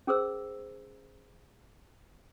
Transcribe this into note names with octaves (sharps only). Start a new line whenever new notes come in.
C#4 G#4 A#4 C5 E6